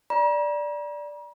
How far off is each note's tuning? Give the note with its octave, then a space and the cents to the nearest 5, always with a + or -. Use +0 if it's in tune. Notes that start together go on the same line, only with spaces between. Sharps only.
D5 +0 A#5 +45